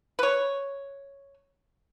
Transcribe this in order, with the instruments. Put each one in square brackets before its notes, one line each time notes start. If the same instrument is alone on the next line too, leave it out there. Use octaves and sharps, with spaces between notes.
[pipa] B4 C#5